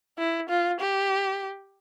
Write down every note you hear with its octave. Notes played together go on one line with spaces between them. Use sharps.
E4
F4
G4